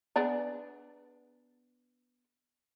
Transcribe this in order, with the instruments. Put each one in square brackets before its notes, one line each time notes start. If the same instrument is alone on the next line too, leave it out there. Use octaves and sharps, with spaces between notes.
[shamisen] B3 D4 G#4